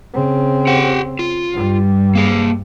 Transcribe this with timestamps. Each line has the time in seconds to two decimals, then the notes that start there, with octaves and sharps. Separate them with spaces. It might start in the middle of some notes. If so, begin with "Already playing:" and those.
0.14 C#3 C4
0.67 G4 F#5 G5
1.19 F4
1.53 G2 G3
2.15 A#3 G#4